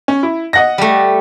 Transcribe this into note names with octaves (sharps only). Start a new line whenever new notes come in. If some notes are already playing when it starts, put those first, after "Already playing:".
C#4
E4
D#5 F#5 A#6
G3 A3